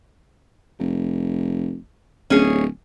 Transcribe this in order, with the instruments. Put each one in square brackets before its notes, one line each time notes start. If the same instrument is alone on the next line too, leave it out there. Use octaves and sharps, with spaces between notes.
[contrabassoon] F1
[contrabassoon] D1 [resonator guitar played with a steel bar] C#4 G#4